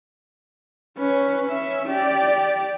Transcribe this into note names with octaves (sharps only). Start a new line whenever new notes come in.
C#4 B4
C#4 E5
G4 D5